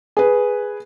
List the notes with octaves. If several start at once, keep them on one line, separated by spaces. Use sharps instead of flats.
G#4 B4